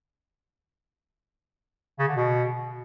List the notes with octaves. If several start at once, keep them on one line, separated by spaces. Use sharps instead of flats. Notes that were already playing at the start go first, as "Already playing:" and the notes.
C#3
D3
B2